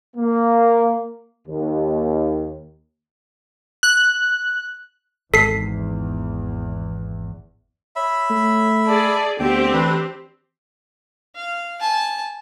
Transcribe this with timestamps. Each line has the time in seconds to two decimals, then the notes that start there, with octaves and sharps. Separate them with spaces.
0.17 A#3
1.48 D#2
3.83 F#6
5.34 G#1 E2 A4 B6 C7
7.96 C#5 E5 B5
8.31 A3
8.86 G#4 D5 A5
9.40 D2 B3 C4 G4 G5
9.73 E3 D4 B4
11.36 F5
11.80 G#5 A5